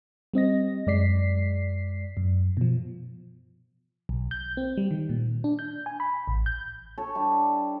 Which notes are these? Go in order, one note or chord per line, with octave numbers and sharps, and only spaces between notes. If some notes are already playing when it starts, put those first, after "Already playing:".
G3 C4 D#5 A#6
F#2 G#3 D5 B6 C7
F#2
B2 F3
B1
G6
C4
G3
D#3
A#2
D4
G6
G#5
B5
A1
G6
A4 C#5
G3 D4 E4